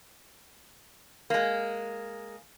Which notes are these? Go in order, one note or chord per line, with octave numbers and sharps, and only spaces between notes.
G#3 A#3